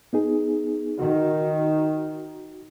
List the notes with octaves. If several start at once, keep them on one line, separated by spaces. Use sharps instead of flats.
B3 D#4 G#4
D#3 F#4